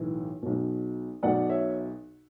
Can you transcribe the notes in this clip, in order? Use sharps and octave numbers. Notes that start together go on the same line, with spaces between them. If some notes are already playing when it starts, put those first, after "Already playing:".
Already playing: B1 A2 E3
B1 B2
B1 B2 D5 F#5
C#5 E5